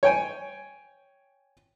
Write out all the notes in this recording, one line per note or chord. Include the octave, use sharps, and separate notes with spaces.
C#5 G5 G#5